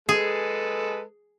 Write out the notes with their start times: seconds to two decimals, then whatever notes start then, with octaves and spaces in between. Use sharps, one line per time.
0.09 G#3 G#4 A4 B4